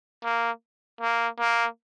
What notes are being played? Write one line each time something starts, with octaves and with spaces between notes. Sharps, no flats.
A#3
A#3
A#3